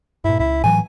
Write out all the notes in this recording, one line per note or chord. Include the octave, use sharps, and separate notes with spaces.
G2 A#2 E4
C#2 E4
A2 E3 F#3 G#5